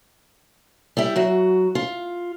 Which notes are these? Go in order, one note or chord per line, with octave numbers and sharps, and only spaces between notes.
G3 E4 G5
F#3 F#4
F4